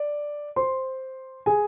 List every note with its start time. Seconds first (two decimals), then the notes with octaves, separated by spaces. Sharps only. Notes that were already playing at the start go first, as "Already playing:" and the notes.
Already playing: D5
0.56 C5 C6
1.46 G#4 G#5